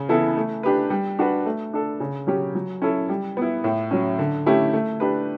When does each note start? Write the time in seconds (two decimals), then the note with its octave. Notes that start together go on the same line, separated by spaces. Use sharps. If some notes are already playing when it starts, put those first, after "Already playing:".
Already playing: C#3
0.09 E3 B3 E4 A4
0.36 A3
0.63 D4 G4 B4
0.90 G3
1.19 D4 F#4 B4
1.46 A3
1.73 D4 A4
2.00 C#3
2.27 F#3 C#4 G4
2.55 F#3
2.82 C#4 E4 A4
3.09 G3
3.37 B3 E4
3.64 A2
3.91 F#3 C#4
4.19 D3
4.46 A3 C#4 E4 G4
4.73 A3
5.00 D4 G4 B4